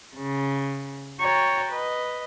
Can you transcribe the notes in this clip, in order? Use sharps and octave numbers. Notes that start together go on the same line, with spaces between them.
C#3
F#4 C#5 G5 A#5 A6
B4 D#5